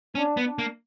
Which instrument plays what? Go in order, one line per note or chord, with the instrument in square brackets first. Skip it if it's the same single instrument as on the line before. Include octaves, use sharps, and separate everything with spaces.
[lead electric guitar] C#4 [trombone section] D4
[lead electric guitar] B3
[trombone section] D4
[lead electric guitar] A#3